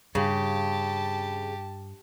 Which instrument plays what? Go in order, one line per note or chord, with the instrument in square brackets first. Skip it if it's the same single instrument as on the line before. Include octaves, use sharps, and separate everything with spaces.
[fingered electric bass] G2 [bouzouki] C#3 [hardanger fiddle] G4 [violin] A5